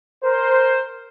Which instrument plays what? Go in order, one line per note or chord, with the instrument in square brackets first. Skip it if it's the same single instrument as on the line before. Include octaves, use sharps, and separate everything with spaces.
[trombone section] A#4 C5